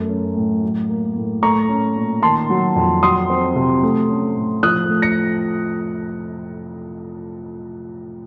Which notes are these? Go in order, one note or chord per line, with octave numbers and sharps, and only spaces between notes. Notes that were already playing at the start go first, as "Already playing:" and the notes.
Already playing: F#2 A3
C#4
A2
F#3
A#3
A2
A3 A#5 C#6
C#4
A#2
D#3 A5 C6
F#3
F2
F#3 C6 D#6
C4
C3
A3
C#4
A2
F3 D#6 F#6
A3
A#6 C#7